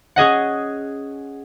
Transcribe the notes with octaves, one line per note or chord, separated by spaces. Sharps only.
C#4 G#4 D#5 F#5